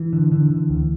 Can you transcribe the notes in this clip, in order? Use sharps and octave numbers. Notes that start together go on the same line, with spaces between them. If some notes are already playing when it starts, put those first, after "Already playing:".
Already playing: E3
D3
D3
D3
D2